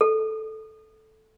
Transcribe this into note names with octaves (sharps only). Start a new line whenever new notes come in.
A4